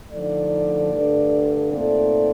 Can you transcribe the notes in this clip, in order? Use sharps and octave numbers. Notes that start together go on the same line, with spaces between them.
D3 F3 A3 D#4 D5
G2 D3 A3
A#2 A3 C4 D#4 D5